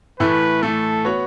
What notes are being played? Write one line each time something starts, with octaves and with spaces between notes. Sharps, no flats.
A2 E3 A3 B4
A2 E3 A3 A4
B3 F#4 C#5